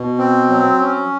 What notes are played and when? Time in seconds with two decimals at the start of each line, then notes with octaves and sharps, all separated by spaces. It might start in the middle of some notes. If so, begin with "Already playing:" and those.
Already playing: B2
0.18 C4
0.50 F#3
0.81 C#4